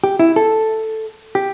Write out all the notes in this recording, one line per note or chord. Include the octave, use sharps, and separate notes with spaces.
G4
E4
A4
G4